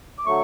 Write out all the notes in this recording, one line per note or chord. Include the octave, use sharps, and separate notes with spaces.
D6
D3 F#3 A3 C#6